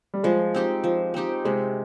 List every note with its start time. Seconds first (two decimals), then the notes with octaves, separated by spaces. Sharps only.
0.14 G3
0.24 F3 G#3
0.54 C4 D#4 G4
0.84 F3
1.14 C4 D#4 G4
1.45 C3 G#3